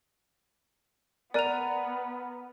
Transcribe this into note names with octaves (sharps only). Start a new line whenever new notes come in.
B3 A#4 D5 F#6 D#7 F7